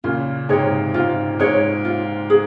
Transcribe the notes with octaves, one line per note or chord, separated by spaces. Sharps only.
A#2 C#3 F4
G#2 C3 G#4 C#5
G#2 F4
G#2 G#4 C#5
F4
G#4